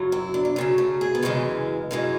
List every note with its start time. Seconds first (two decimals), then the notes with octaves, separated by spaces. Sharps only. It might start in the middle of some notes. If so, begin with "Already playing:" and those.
Already playing: F#2 C#3 F#3
0.12 E4
0.34 D4
0.45 D4
0.56 F#2 C#3 F#3 C#4
0.78 A3
1.01 G#4
1.15 B3
1.23 F#2 C#3 E3 G#3 A3
1.91 F#2 C#3 E3 G#3